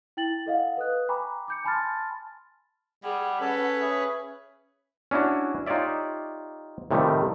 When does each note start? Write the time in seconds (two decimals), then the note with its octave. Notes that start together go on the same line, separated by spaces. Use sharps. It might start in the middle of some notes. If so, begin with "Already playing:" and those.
0.17 E4 G5 A6 F#7
0.46 A4 D#5 F5 F#5
0.77 B4 D#6 F#6
1.08 G5 G#5 A#5 B5 C#6 D6
1.48 D6 G6 C#7
1.64 G#5 A5 B5 C6 F6 A6
3.04 G3 G#4 F#5
3.41 C#4 A4 B4 C#5
3.81 G#4 E5
5.11 C#4 D4 E4 F#4
5.66 D#4 F4 G4 C#5 D5 E5
6.91 A2 C3 D#3 F3 G3 A3